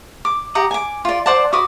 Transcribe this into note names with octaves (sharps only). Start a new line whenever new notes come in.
D6
G4 F#5 A#5 D#6
G#5 D6
F4 D5
C5 D5 F#5 A5
F#4 B4 D6 D#6